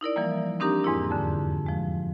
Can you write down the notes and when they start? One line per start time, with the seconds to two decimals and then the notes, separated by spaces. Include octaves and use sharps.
0.01 D#4 E4 A#4 D5
0.16 E3 F3 G3 A#3
0.60 C4 D4 D#4 G4 A#4 A#5
0.84 E2 G#2 A#3 E4
1.11 F2 D3
1.66 F3 G#3